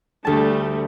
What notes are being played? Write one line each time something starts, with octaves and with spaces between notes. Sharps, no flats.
D2 G3 A3 A5